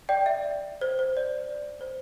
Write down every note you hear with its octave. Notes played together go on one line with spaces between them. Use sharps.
D5 G5
E5
C5
C5
D5
C5